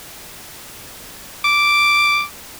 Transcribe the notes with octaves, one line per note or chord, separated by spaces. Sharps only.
D6